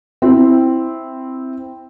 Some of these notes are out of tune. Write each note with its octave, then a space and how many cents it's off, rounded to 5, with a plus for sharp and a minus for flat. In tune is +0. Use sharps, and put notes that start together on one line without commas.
C4 +0 E4 +0